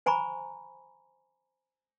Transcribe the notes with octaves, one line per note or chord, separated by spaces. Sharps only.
C5 G#5 A#5 B5 C#6